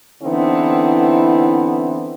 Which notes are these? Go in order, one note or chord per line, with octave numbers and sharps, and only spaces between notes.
D3 E3 B3 C4 D#4 E4